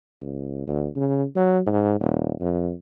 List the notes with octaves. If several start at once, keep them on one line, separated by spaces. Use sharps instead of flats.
C#2
D2
C#3
F#3
G#2
D#1
F2